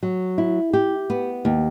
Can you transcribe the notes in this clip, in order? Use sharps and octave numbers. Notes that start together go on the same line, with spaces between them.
F#3
E4
G4
B3
D#2